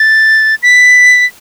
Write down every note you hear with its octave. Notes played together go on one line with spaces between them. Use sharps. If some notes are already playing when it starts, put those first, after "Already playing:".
Already playing: A6
B6